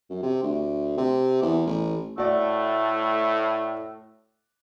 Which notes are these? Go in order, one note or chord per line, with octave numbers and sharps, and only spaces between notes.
F#2
C3
D2
C3
E2
A1
A2 A3 F#4 D5